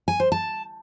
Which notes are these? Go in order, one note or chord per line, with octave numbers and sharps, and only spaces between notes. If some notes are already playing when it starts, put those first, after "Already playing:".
G#5
C5
A5